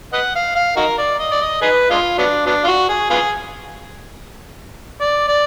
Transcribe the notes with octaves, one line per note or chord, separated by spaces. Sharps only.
B4 D#5 F#5
F5
F5
D#4 F#4 A#4
D5
D#5
D5
D#5
D#4 G#4 B4
G#3 D4 F4
F#3 B3 D4
F#3 B3 D4
F4
F#4
G#4
B3 F4 G#4
D5
D5